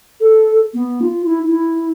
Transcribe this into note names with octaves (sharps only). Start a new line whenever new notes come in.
A4
B3
F4
E4
E4